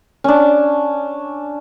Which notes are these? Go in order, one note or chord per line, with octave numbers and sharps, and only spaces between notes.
C#4 D4